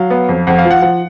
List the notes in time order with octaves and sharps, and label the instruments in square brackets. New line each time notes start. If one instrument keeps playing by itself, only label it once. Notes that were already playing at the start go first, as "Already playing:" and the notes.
Already playing: [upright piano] F#3 [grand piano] F5
[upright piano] B3
F2
[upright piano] F2 [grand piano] F#5
[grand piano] F5
[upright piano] F3
[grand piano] F#5
[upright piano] F3 [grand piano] F#5